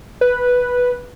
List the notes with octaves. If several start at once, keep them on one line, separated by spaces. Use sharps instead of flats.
B4